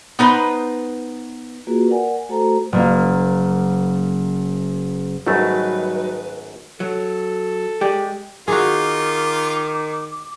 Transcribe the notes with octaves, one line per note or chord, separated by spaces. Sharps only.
B3 D#4 B4 C5
A#3 F4 F#4 G#4 B4
A#4 D5 F#5 G#5
A3 F#4 A4 C5 A#5
F#1 A#3
G#1 F#2 F#3 G3 A3 D#4 B4
F#3 A4
G#3 G4 D5
D#3 F4 F#4 G#4 D6